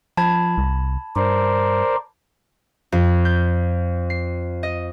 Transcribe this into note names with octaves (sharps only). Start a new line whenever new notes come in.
F3 A5 B5 G#6
C2
G2 A#4 C5 D5
F2
G6
C7
D#5